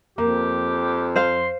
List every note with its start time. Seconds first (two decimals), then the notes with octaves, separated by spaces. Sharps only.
0.18 F2 A#3 G4
1.16 C5 F5 C6